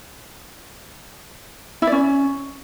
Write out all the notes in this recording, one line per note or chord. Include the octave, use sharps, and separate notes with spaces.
E4
D5
C#4